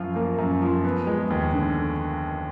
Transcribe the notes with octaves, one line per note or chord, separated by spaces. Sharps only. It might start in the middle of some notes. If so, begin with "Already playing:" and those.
Already playing: F#2 F3 F4
A#3
F#2
F3
B3
G#3
D#2
D3